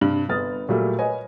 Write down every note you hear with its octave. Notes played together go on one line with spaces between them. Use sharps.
G2 C3 F#7
G1 B3 D#6 F6 A6
A#2 F#3 G3 A3
B4 C#5 D#5 G#5